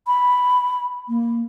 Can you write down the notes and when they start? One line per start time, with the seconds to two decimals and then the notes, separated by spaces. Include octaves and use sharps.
0.07 B5
1.09 A#3